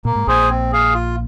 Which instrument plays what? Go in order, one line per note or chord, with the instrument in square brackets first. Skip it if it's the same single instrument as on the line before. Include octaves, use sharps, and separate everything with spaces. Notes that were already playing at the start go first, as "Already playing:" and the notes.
[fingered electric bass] A#2 [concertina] A#3
[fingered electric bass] G#2
[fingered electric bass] A#1 A#2 [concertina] G#4 C5 G#5
[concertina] C4
G#4 F5
F4